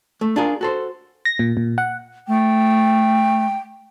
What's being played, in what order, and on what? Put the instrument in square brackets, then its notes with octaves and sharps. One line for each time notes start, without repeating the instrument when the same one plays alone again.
[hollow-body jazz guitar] A3
D4 F4 G#4 A#4
F#4 A4 C5
[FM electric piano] A#6
A#2
A#2
F#5
[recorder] A3 [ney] G5